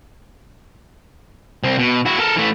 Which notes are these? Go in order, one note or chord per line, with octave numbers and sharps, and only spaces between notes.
C2 C4
B2
E4 F#4
A4 A#4
E3 A3